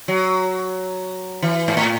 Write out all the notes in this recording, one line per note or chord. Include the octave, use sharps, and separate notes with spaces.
F#3
E3
G#2
A2